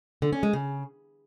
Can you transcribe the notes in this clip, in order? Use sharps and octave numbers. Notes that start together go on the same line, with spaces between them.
D3
C#4
G#3
C#3